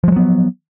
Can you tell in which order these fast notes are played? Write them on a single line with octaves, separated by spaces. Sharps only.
F3 G#3 F#3 B3